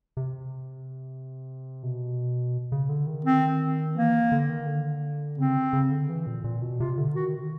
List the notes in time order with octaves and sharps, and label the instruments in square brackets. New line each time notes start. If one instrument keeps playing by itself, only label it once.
[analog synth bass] C3
B2
C#3
D3
D#3
[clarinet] C4
[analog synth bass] E3 [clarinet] A#3
[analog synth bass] D3
D#3
D3
[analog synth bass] C#3 [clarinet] C4
[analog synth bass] C#3
D3
E3
A#2
A#2
B2
[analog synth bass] C3 [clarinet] F4
[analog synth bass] D3
[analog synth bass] D#3 [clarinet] F#4